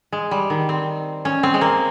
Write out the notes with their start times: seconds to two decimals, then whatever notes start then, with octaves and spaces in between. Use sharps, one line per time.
0.12 G#3
0.31 G3
0.50 D#3
0.69 C4
1.25 C#4
1.43 C4
1.54 G#3
1.61 A#3